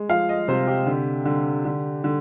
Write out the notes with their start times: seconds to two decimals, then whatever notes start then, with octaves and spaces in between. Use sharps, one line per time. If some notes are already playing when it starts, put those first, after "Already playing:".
Already playing: G#3
0.09 F3 F5
0.29 D#5
0.48 C3 C5
0.67 G4
0.86 D3
1.25 D3
1.65 D3
2.04 D3